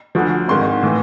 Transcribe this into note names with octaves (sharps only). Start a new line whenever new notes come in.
D2 D3 F3
G#1 G#2 D#3 C6
A2 E3